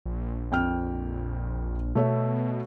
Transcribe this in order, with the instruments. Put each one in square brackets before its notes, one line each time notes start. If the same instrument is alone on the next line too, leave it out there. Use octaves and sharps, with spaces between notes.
[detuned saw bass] A#1
[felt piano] F2 G5 F6
[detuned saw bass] B2 [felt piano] A3 C#5 E5